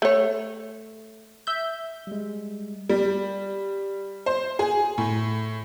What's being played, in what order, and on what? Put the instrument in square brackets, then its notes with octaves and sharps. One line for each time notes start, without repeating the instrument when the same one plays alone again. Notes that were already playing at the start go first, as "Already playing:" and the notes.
[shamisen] A3 C#5
[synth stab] E5 G6
[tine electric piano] G3 G#3
[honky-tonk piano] G3
C5
G#4
A2